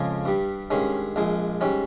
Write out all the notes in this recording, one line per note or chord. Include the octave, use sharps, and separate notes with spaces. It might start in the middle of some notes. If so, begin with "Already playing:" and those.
Already playing: F2 C#3 F3 G#3
G2 G3
G2 D#3 G#3 C#4
A#1 A#2 G#3
G#2 G3 C#4